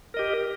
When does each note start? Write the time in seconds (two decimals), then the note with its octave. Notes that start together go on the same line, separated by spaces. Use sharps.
0.14 A#4
0.17 D#5
0.19 G4